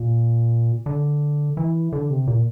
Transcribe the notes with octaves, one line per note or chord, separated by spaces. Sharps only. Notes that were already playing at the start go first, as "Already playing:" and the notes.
Already playing: A#2
D3
E3
D3
C3
A#2